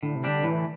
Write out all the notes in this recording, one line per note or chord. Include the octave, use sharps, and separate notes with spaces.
A2 D3
C3
D3 G3 D4
A2 E3